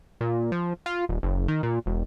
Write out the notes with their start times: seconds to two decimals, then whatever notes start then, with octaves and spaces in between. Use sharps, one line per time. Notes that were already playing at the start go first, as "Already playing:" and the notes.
0.21 A#2
0.52 F3
0.86 F4
1.09 D#1
1.23 F#1
1.48 D#3
1.63 A#2
1.86 E1